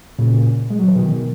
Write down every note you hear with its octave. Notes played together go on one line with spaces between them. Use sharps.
A#2 C#3
G#3
F#3
E3
B2 D#3